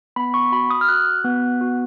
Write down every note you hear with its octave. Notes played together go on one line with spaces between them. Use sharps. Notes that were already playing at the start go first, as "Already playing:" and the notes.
B3 B5
C#6
F#4 B5
D#6
F6
F#4 F#6
B3
F#4